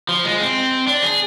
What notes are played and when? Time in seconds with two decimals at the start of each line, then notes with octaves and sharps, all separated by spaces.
0.09 F3
0.25 G#3
0.40 C4
0.87 D4
1.03 G#4